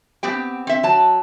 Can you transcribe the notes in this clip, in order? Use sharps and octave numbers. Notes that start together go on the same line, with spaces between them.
B3 C4 G4 G5
C4 E5
F#3 A5